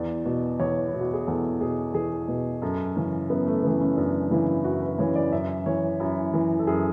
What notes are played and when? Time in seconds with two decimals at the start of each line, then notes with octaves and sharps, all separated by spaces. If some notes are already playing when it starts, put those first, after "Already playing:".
Already playing: E2 D5
0.25 B2
0.60 E2 C#5
0.87 E4
0.93 B2
1.00 F#4
1.14 G#4
1.27 E2 A4
1.61 B2 G#4
1.94 E2 G#4
2.28 B2
2.62 F#2 A4
2.96 C#3 E3 C#4
3.30 F#2 B3
3.47 A3
3.63 C#3 E3 B3
3.81 C#4
3.97 F#2 D4
4.31 C#3 E3 E4
4.64 F#2 F#4
4.82 B4
4.99 C#3 E3 C#5
5.16 D5
5.32 F#2 E5
5.66 E3 C#5
6.00 F#2 E4
6.34 E3
6.59 A4
6.67 F#2 G#4